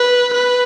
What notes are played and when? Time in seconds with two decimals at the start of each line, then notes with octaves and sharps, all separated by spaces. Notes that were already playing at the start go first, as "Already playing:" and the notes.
Already playing: B4
0.34 B4